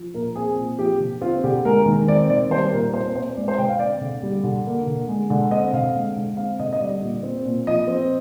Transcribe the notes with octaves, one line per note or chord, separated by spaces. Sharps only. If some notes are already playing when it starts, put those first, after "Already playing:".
Already playing: F3
A#2 A#4
C4 G#4
A#2
F3 G4
D3
C4 F4
D3 G4
G#3 A#4
D#3
C4 D5
D#3 D5
G3 C5
A#2 A#4
C4 C5
A#2 C5
G#3 D5
C5
D3 G5
F5
C4 D5
D3
G3
D3
A#3
D3
G#3
D3
C4 D#5
D3 F5
G#3
D3
C4 F5
D3 D#5
D#5
G3 D5
A#2
C4
A#2
F3 D#5
C4